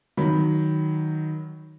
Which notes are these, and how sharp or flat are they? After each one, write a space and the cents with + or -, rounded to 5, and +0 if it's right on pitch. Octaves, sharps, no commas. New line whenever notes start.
D#3 +0 F#3 +0 B5 +0